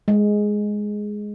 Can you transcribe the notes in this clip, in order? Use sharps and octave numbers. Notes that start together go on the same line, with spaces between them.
G#3